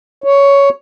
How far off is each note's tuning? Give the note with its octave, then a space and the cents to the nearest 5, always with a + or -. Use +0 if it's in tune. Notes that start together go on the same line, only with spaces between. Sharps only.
C#5 +10